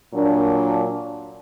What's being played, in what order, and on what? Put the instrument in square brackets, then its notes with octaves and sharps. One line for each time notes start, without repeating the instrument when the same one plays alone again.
[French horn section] A#2 F#3 A#3 D4